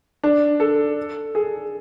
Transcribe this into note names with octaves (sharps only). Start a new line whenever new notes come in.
D4
A4
G#4